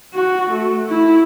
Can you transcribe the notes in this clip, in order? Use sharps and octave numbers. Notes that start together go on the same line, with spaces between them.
F#4
A3
E4